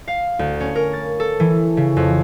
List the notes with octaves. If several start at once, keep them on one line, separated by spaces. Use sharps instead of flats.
F5
D2
C#4
A#4
A6
A4
E3
C#3
F2